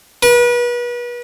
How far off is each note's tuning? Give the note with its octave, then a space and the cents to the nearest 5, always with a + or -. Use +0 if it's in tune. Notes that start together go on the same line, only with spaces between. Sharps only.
B4 -35